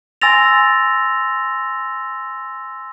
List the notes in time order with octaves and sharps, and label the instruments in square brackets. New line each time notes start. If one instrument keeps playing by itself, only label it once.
[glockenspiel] G#5 C6 E6 A6 A#6 F7